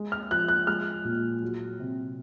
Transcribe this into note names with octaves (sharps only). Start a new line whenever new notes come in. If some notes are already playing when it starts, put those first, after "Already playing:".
Already playing: G#3
F6
F3 F#6
F#6
G#3 F6
A#2
F#3
C3